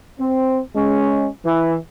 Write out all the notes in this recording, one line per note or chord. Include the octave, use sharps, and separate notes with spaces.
C4
G#3 C#4
E3